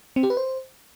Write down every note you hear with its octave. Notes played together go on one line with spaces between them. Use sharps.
C4
G4
B4
C5